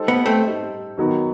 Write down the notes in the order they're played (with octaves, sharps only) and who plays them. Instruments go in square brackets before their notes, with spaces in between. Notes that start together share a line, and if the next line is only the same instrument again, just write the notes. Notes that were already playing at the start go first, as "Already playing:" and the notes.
Already playing: [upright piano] G3 D#4 A4 C5
[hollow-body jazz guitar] B3
A3 C4
[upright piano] G3 D#4 A4 C5
D#3 F#3 B3 D#4 F#4